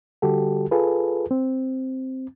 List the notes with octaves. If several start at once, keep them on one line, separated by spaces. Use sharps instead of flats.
D3 G3 F#4 G4 A4
F4 G#4 A4 B4
C4